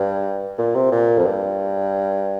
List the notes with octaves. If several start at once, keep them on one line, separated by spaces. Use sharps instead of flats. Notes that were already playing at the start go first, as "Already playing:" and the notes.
Already playing: G2
A#2
C3
A#2
F2
G2